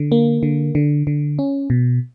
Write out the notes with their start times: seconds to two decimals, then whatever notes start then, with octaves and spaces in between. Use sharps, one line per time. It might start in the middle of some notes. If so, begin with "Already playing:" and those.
Already playing: D3
0.12 A#3
0.43 D3
0.75 D3
1.07 D3
1.39 C#4
1.70 B2